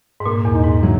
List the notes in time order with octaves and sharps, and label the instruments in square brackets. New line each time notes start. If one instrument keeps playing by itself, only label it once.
[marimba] G#2
[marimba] A#2 [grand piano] A#3
[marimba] E2
[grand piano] D#4
[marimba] G#2
[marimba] C#3 E3 [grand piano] F#3